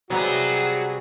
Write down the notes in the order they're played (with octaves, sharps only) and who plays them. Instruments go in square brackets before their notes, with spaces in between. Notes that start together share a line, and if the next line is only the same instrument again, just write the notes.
[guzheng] C3 G3 [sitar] F#3 B3 [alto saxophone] F#4 [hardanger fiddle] G#4